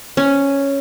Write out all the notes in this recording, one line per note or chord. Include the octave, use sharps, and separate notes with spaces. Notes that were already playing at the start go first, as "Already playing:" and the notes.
C#4